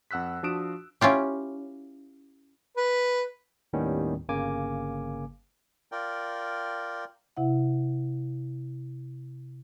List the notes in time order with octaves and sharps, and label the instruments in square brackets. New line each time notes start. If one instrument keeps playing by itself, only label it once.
[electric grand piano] F2 F#5 E6 F#6 B6
F3 D4 F#4 D#6 D7 E7
[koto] C#4 E4 F4 G4
[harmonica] B4
[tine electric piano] D#2 A2 D#3 G3 B3 C#4
G1 C#3 A#3 G#5 D6
[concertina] F4 A#4 D5 G5
[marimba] C3 E4 E5 F#5